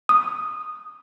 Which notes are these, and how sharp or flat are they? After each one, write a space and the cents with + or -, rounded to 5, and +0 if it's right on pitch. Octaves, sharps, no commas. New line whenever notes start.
D#6 -10